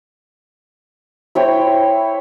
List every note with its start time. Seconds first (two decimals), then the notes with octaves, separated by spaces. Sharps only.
1.35 E4 C5 C#5 G5